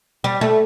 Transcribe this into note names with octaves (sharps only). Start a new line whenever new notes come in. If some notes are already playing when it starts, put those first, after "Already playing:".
G3
A3